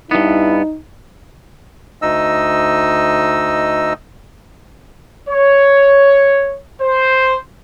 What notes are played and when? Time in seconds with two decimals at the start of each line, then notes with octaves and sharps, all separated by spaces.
0.11 G2 B3 D#4 E4
2.02 D2 D#4 D#5 E6
5.28 C#5
6.81 C5